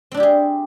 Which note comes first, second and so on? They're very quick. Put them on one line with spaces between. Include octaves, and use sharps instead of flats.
C4 D4 E4 G4 G#4